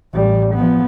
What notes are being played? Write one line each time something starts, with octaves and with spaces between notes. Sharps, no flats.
A1 G3
F3 B3